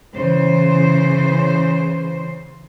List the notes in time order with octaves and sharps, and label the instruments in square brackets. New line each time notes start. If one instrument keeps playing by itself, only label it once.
[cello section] C#3 E3 C5